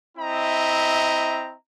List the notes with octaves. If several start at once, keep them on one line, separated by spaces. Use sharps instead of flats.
C4 E4 D#5 E5 A#5